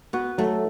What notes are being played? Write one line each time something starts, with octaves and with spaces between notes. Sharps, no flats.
B3 F#4
F#3 A3